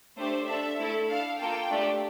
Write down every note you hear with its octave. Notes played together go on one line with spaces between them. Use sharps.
A3 D4 G4 C5
D4 A4 E5
A3 E4 A4
D4 A4 F5
A#3 F4 A4 G5
A3 D4 G4